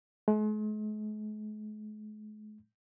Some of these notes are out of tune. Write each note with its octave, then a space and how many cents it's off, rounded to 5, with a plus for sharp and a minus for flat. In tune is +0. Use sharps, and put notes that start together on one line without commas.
G#3 +45